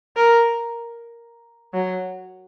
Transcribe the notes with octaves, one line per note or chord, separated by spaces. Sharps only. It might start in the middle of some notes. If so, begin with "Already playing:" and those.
A#4
F#3